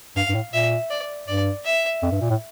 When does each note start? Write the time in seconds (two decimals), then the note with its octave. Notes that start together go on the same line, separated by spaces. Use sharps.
0.16 G2 F5
0.29 G2
0.35 A2
0.53 A#2 E5
0.90 D5
1.28 G2 D5
1.65 E5
2.03 F2
2.12 G2
2.21 A#2
2.30 A2